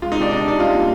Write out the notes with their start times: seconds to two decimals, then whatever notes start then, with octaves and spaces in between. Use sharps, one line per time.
0.02 G#3 F4
0.12 D#4
0.16 C3 D4
0.31 C3 D4
0.45 C3 D#4
0.60 G3 F4
0.74 A#2